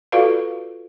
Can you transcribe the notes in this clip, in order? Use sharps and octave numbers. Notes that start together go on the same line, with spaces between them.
F4 F#4 A4 B4 D5 F5